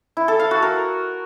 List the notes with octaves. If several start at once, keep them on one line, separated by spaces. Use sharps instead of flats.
E4
A4
F5
F#4
A#4